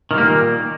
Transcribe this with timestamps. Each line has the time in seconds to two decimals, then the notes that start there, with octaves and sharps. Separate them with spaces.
0.11 D#3
0.14 G3
0.18 A#3
0.21 A#2